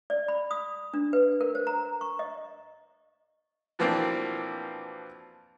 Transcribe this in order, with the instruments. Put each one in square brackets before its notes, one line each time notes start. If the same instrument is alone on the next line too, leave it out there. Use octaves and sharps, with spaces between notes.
[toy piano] D5
B5
D#6
D4
B4
A#4
C5
A#5
C#6
D#5
[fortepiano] B2 E3 F3 A#3 C4 D4